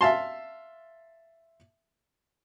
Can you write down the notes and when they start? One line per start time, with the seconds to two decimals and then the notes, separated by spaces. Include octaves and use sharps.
0.01 E5 F5 A5 C6